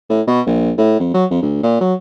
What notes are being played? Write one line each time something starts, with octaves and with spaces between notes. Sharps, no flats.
A2
B2
A#1
A2
F2
F#3
F2
D2
A#2
F#3